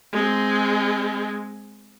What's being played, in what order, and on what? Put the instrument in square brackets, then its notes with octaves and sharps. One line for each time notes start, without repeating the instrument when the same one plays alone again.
[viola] G#3 C4